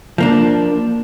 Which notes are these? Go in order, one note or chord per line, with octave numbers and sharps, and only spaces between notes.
F3 A#3 D4